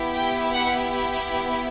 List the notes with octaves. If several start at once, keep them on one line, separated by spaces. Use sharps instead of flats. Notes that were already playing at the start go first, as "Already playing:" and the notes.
Already playing: B3 E4 G4
G5
F#5